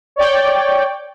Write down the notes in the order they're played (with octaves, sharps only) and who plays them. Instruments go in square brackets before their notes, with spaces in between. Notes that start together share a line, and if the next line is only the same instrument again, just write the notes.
[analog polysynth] C#5 D5 G5